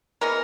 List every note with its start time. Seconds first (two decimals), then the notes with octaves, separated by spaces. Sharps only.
0.21 E3 G#3 B3 A#4